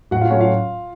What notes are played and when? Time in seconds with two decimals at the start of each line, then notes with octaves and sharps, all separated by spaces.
0.11 A2 F#4 F#5
0.21 F4 F5
0.30 F#3 A3 C#4 C#5
0.40 F4 F5